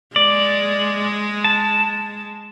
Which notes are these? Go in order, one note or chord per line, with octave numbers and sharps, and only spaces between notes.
G#3 D5
A5